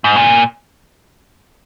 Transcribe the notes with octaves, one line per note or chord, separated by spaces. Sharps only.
G#2
A#2